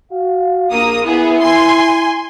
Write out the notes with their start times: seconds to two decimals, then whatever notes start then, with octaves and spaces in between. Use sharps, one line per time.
0.11 F#4 F5
0.71 A#1 A#3 D#6
1.06 B3 E4 G#4
1.40 G#5 C6